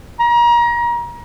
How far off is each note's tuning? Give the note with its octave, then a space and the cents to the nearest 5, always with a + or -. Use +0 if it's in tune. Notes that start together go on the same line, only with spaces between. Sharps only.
A#5 +30